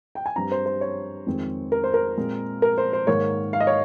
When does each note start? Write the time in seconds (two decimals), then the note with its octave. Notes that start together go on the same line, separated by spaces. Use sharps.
0.15 G5
0.26 G#5
0.36 G2 G3 C4 A#5
0.52 C5
0.66 C5
0.81 C#5
1.26 F2 D#3 G#3 C4
1.72 A#4
1.84 C5
1.94 A#4
2.17 A#2 G#3 C4
2.62 A#4
2.78 C5
2.93 C5
3.07 G#2 D#3 A#3 C#5
3.53 F5
3.60 D#5
3.67 C#5